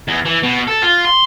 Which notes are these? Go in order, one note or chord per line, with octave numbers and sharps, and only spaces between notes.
E2
E3
B2
A4
F4
C6